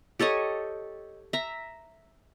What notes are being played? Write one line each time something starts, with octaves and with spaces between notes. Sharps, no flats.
G4 A4 C#5 D#5
E5 A#5